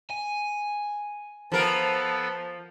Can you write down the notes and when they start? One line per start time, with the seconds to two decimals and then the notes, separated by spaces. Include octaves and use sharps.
0.10 G#5
1.52 F3 B3 A4 A#4